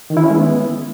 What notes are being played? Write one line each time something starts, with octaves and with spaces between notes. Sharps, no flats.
D#3
E4
C#4
G#3
B3